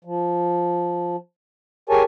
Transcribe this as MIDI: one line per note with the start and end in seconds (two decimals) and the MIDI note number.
0.04 1.16 53
1.89 2.03 67
1.89 2.03 68
1.89 2.03 70
1.89 2.03 73
1.89 2.03 80
1.89 2.03 81